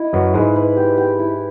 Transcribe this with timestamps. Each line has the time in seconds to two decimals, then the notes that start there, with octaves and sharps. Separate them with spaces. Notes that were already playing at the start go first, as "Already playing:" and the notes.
Already playing: E4 D#5
0.13 F#2 F#3 B4
0.34 G#2 G#3 B4
0.56 B4
0.77 G4
0.98 G4
1.19 E4